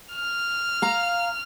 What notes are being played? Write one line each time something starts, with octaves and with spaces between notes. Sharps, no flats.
F6
F5 A#5